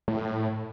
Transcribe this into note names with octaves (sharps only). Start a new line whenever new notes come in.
A2